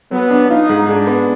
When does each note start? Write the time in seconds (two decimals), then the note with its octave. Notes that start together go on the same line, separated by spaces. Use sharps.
0.11 F#3 B3
0.30 D4
0.49 D#4 F4
0.69 G#2
0.88 G#3 D4
1.07 B3